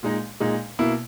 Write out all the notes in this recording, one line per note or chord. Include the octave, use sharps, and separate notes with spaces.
A#2 G#3 D#4
A#2 G#3 D#4
B2 A#3 E4